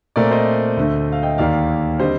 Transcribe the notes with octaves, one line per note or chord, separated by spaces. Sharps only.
A#2 A3 C4 A#4 D5
C5 D#5
D2 D3 A3
F5
D#5 G5
D#2 D#3 A#3 D5 F5
D3 G3 C4 C5 D#5